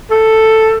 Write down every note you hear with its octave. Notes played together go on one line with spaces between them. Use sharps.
A4